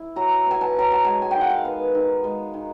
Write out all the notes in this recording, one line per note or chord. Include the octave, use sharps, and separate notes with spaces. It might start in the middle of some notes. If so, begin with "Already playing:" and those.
Already playing: E4
F#3 A#5
B3 G#5
A5
F#3 A#5
A5
G#3 G#5
G#5
D#3 G5
F#5
F5
B3
D#3
G#3
D#3